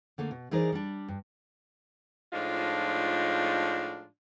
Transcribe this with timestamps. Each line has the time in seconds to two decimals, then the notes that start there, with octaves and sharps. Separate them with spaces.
0.18 D3 A3 A#3
0.31 B2
0.51 E3 D#4 G#4 A#4 C5 D5
0.72 G3 D4
1.08 G2
2.33 A2 F3 G#3 D4 D#4 F4